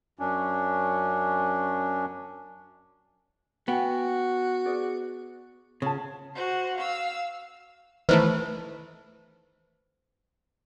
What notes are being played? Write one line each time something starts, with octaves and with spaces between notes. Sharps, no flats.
F#2 C#4 D4
B3 F#4 G5 G#5
G#4 B4 D5
C#3 C#4 F4 A5
F#4 C5
F5 E6
D#3 E3 A3 B4 C5